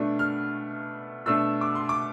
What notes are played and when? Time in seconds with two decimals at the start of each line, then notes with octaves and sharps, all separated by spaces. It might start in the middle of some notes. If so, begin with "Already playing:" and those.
Already playing: B2 A3 D4
0.19 F6
1.26 B2 A3 D4 E6
1.61 D6
1.75 C6
1.89 D6